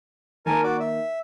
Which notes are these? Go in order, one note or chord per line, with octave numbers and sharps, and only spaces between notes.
D#3 A#3 A#4 G#5 A5
F#4 D5
E5